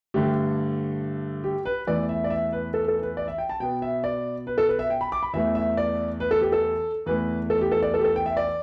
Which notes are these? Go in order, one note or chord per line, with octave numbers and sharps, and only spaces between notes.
G2 D3 A3 G4
G4
B4
E2 E3 A3 D5
E5
D5
E5
B4
A4
A4
B4
D5
E5
G5
A5
B2 B3 G5
E5
D5
B4
A4
B4
E5
G5
B5
D6
B5
E2 E3 A3 E5
E5
D5
B4
A4
G4
A4
E2 E3 A3 B4
A4
G4
A4
D5
A4
G4
A4
G5
E5
D5